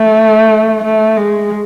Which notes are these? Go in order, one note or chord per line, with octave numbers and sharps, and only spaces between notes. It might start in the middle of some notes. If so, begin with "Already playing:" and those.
Already playing: A3
A3
G#3